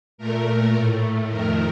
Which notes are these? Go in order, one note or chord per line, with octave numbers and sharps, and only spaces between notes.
A#2 A3 A#4
A2 A3
F2 D#3 A3 A#4